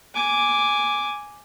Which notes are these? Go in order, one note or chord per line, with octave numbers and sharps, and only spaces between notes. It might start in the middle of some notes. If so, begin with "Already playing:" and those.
G#5 D6